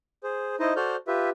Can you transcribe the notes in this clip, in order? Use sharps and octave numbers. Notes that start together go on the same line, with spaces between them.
G#4 C5
D#4 E4 C5 D#5
F#4 A4 C5 D5 F6 G6
F4 G4 B4 E5